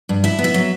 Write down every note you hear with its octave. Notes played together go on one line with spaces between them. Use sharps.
G2
E4 E5
B3
E5
F#3